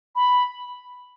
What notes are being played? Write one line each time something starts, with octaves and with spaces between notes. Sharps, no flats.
B5